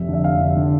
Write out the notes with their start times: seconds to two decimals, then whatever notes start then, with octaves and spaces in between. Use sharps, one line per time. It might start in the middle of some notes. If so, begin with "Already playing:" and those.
Already playing: F1 F2 E5
0.08 D3
0.13 E5
0.24 F1 F5
0.40 D3
0.57 D3